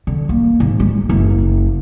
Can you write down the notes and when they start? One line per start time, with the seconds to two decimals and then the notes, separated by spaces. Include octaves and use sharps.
0.07 D3
0.29 A#3
0.60 G#2
0.80 G#3
1.09 F#1